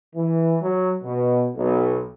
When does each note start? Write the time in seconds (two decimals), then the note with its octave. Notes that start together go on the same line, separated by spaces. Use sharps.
0.15 E3
0.61 F#3
1.03 B2
1.56 B1